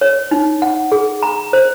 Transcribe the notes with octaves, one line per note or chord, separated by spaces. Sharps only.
C#5
D#4
F#5
G#4
A#5
C5